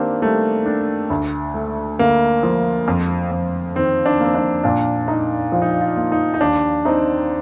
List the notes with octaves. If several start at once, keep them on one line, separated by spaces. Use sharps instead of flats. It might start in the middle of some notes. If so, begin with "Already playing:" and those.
Already playing: D#3 A#3 C4 D4 G4
G3 A3
D4
D2
A3
D3 A#3
F3
F2
F2
D#3 C4
D4
A#3 C4
D4
A#2 D4
D#4
F3 F4
D#4
F4
F4
A#3
D#4
D#4
D#2 D4
C4 D#4